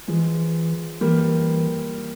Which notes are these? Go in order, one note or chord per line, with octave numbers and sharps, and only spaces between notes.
E3 F3 G#3
E3 G3 A#3